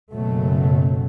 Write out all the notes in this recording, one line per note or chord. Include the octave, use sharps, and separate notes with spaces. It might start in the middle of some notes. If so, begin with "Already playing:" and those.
F#1 B2 F#3 A3